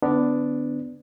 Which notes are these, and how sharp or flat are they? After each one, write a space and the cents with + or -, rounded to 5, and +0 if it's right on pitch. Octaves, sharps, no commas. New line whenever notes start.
D3 +0 B3 +25 D4 +0